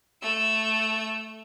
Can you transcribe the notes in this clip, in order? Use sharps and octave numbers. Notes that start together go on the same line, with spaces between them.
A3 E6